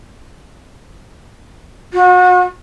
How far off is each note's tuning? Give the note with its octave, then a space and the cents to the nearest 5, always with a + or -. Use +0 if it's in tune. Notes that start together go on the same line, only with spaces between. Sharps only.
F#4 -35